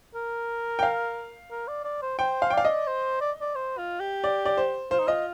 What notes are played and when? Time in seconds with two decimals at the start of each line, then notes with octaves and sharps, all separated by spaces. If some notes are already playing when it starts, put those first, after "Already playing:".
0.15 A#4
0.79 G5
0.83 F5
1.51 A#4
1.68 D5
1.85 D5
2.02 C5
2.19 C5 G5
2.42 F5
2.50 G5
2.53 D5 F5
2.65 D#5
2.87 C5
3.21 D5
3.41 D5
3.55 C5
3.78 F4
4.00 G4
4.24 D5
4.46 D5
4.57 C5
4.91 F4 C5
4.99 D#4
5.07 F4 D#5